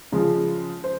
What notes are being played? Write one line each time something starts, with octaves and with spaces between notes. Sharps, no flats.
C#3 F3 G#3
C5